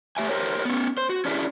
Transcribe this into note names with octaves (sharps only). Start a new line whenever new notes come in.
A3 G4 E5 G#5
G4 A#4 C5 C#5
B3 C#4
C5
F#4
C#4 D4 E4 G4 G#4